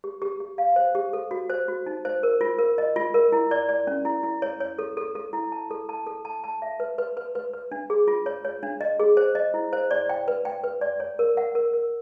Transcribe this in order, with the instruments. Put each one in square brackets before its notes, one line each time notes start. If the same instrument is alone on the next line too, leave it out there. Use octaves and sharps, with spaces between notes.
[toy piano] G4
G4
G4
F5
C5
G4
A4
F#4
C5
F#4
D#4
C5
A#4
F4
A#4
D#5
F4
A#4
E4
D5
D5
C#4
E4
E4
C#5
C#5
A4
A4
A4
E4
A5
A4
A5
A4
A5
A5
E5
B4
B4
B4
B4
B4
D4
G#4
F4
C#5
C#5
D4
D#5
G#4
C5
D#5
E4
C5
D5
G5
B4
G5
B4
D5
C#5
A#4
F#5
A#4
A#4